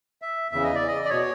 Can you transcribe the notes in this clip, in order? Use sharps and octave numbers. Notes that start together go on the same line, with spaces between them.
E5
E2 C#3 E3 E5
D#5
D5
D#5
D5
B2 C#5